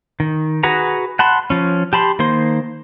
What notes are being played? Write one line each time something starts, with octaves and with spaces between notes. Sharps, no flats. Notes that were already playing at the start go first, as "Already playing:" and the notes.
D#3
F#4 G#4 B4 F#5 A#5
F#5 A5 B5 C6
F3 C#4
G4 A5 B5 C6
D#3 A#3 C5 C6